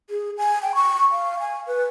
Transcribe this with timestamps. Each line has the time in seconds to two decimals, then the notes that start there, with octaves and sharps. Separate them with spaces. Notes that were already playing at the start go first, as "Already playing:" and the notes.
0.10 G#4
0.38 G#5
0.62 G5
0.75 C#6
1.12 F5
1.40 G#5
1.67 B4